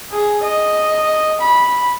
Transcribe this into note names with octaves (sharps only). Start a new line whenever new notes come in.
G#4
D#5
B5